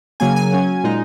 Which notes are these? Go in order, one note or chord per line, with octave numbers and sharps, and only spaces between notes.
C#3 F#3 A#3 G#5
G#5
F#3 C#4
A#2 G#3 D#4